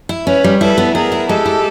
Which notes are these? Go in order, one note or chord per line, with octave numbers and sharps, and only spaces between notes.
E4
C#4 B4 C#5
G3
E4 A4 B4
B3
B3 G#4 A#4
E4
G#3 G4 A4
E4